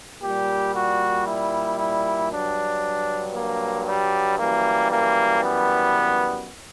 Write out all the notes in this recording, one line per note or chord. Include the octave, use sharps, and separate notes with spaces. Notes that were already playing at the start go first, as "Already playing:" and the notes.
A#2 G3 G4
F#4
E4
E4
G2 F#3 D4
A#3
G3
F#2 E3 G3 A#3
A#3
B3